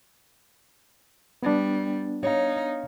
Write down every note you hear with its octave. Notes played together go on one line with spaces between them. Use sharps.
G3 B3 D4
D#4 C#5 F5